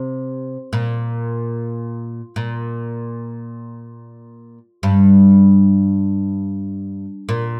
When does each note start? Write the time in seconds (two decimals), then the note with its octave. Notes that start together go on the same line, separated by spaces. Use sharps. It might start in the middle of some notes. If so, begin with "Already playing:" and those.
Already playing: C3
0.73 A#2
2.36 A#2
4.83 G2
7.29 A#2